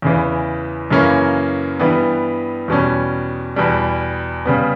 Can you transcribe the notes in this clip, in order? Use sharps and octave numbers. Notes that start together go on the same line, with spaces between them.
E2 C#3 E3
F#2 C#3 E3 A#3 C#4
G2 E3 G3 B3
E2 B2 G3 C#4
E2 B2 G3
C#3 G3 B3